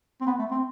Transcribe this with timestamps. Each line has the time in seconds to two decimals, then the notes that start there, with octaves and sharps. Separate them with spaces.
0.21 C4
0.27 B3
0.39 A3
0.51 C4